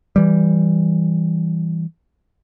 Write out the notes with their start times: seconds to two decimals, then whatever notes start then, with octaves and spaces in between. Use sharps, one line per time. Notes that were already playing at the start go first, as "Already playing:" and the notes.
0.16 E3 G3